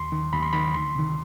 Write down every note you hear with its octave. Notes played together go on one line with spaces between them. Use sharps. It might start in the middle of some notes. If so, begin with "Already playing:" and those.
Already playing: D#2 C6
D#3
D#2 B5
C6
D#3 B5
D2 C6
C3 D#3